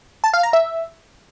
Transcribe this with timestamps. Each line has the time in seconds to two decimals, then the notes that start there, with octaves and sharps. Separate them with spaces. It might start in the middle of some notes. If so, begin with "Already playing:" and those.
0.24 A5
0.34 F5
0.43 A#5
0.53 E5